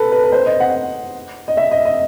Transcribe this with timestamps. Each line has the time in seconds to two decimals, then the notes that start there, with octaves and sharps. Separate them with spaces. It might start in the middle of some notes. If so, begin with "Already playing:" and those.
Already playing: A4 B4
0.12 B4
0.24 B4
0.32 C5
0.46 D#5
0.60 F#5
1.48 D#5
1.57 E5
1.71 D#5
1.85 D#5